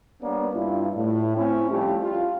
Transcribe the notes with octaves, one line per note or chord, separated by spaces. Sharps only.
G3 A#3 B3 C#4 D4
G2 E4 F4
A2
C4 C#4 E4
F3 G3 A3 F4 G4
F4